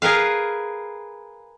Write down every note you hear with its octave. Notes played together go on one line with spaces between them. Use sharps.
G#4 A#4 B4 F5